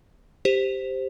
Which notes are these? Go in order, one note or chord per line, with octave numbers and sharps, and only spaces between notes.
G4 C5